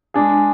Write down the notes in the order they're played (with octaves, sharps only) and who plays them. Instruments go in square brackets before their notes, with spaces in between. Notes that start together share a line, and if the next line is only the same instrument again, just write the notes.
[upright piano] G#3 D4 G#4